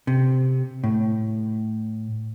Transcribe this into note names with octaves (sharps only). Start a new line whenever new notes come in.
C3
A2